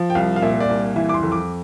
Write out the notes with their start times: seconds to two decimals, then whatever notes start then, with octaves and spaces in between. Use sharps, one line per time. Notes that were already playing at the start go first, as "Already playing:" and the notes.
Already playing: F3
0.10 G5
0.15 C2 F5
0.36 F5
0.42 A#2 E5
0.60 D5
0.69 C2
0.96 E3 E5
1.09 D6
1.14 C6
1.23 F2
1.32 D6